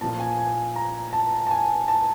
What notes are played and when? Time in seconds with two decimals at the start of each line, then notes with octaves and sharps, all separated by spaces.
0.01 A#2 F3 A#3 A5
0.20 G#5
0.38 G#5
0.76 A#5
1.13 A5
1.47 A5
1.51 G#5
1.88 A5